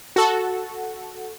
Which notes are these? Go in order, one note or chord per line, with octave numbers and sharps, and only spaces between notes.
F#4 A4